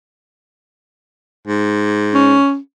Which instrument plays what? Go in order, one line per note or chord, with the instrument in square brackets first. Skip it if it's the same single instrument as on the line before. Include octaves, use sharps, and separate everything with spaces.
[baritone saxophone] G#2
[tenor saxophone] C#4